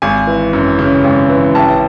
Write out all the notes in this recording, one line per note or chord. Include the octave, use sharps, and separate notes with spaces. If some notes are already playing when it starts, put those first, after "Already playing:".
G#1 G#5
E3
F#2
C#3
G#1
E3
A1 A5